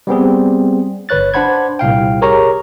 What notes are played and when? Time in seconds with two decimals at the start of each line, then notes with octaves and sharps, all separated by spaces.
0.07 G3 B3 C4 G#4
1.09 G1 B4 C#5 F#6 A6
1.34 D4 C5 F#5 B5 G#6
1.79 C2 A#2 F5 G5
2.22 G4 G#4 A#4 C#5 A#5 C#6